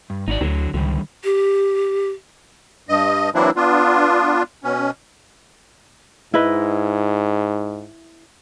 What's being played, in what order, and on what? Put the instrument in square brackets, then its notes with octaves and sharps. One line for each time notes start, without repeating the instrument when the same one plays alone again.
[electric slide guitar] G2
[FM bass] G#1 [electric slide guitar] D#4 F#4 D5
[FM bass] D2 [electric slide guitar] D3 F#3
[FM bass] C#2 [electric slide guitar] D3 D#3 G3
[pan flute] G4
[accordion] G2 D#5
E3 F#3 A#3 C4 D4 E4
B3 D4 F4
B2 C#4
[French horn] G#2 [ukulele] E4 B4 D#5